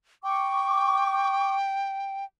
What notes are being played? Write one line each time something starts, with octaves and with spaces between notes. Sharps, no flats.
G5 C#6 D6